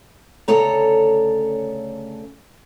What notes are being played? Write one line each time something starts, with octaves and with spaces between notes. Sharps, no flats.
D2 C#3 A4 C#5 A#5